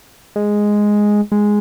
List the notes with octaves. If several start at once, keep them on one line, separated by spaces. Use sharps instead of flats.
G#3
G#3